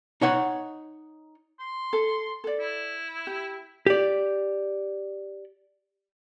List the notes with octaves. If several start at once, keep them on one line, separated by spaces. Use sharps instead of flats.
D#4 C#5 F#5
C6
A4
A4 D5
E4
G4
G4 D5